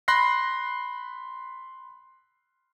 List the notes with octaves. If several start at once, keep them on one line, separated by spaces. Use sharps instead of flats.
B5 C6 F#6 A#6 C7